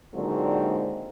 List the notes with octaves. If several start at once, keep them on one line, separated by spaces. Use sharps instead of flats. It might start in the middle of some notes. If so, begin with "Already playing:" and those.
A#2 D3 D#3 F#3 G#3 C4